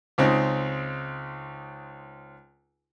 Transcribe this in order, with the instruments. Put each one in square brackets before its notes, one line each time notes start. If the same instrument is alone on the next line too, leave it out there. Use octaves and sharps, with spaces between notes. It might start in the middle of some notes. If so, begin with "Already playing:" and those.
[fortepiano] C#2 C#3 C4 D#4